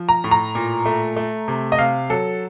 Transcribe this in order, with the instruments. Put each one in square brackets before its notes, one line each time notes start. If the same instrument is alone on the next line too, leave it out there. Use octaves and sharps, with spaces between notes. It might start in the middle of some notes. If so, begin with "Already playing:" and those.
Already playing: [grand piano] F3
A#5
A2
A#5
A#2
A3
A3
C3
D#5
C3 F5
F#3 A4